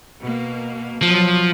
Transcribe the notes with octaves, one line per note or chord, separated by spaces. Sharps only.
B2 A#3
B2 F3 F#3